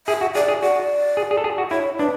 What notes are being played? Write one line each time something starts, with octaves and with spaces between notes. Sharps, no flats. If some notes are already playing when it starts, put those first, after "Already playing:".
G#4 E5
F#4
G#4 D5
G#4
F#4 D5
G#4
G#4
A4
G#4
F#4
E4 C#5
D4 B4